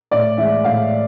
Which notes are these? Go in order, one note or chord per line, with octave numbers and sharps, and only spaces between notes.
A2 D5
E3 G#3 E5
A2 F5